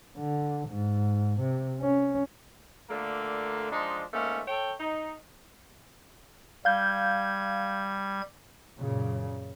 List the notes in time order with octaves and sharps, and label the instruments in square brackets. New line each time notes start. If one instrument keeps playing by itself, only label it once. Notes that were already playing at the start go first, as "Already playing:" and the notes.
[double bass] D3
G#2
C3
C#4
[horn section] A#2 D3 A3 A#3
F3 G#3 D4 D#4
G#2 A3 A#3 C#4
A4 C#5 G5
D#4
[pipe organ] G3 G#6 [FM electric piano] F5 G6
[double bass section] F#2 A#2 C#3